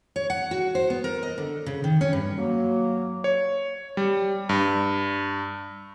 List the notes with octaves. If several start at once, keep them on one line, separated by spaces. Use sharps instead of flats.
C#5
F#5
F#4
C5
B3
A#4
D#5
D3
C#3
D#3
C#4
G2
F#3 A#3
C#5
G3
G2